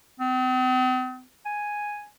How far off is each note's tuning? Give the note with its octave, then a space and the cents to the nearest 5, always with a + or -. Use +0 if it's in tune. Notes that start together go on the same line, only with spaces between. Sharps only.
C4 -45
G#5 +0